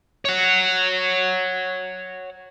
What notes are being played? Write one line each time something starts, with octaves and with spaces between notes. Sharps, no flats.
C#5 F#5